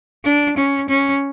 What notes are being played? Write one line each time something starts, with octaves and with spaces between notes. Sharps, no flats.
D4
C#4
C#4